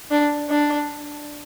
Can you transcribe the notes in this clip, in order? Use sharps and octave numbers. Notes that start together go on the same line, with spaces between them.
D4
D4